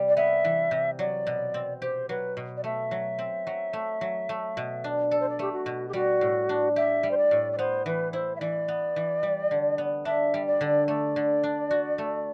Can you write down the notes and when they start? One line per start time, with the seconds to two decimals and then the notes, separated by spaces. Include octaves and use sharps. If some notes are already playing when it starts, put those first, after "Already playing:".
Already playing: C3 G3
0.08 D5
0.16 B3 E5
0.44 E3
0.71 C3
0.99 F#3 D5
1.27 B2
1.54 C4
1.82 G4 C5
2.09 F#3 B4
2.37 B2
2.57 D5
2.64 A3 E5
2.91 F#3
3.19 C4
3.47 F#3
3.73 A3
4.01 F#3
4.29 A3
4.57 B2
4.84 D4
5.11 A4 D5
5.20 C5
5.29 D5
5.39 A3 G4
5.52 F#4
5.66 B2
5.89 G4
5.93 G3 F#4
6.21 A2
6.49 D4
6.76 G4 E5
7.03 G3
7.11 C5
7.17 D5
7.31 A2
7.52 D5
7.58 B3 C5
7.86 E3 B4
8.13 E4 C5
8.36 E5
8.41 E3 D5
8.68 B3
8.96 E3
9.23 G3
9.51 D3
9.78 B3
10.05 D4 E5
10.34 G3
10.47 D5
10.61 D3
10.88 A3 D5
11.16 D3
11.43 D4
11.71 F#4
11.98 A3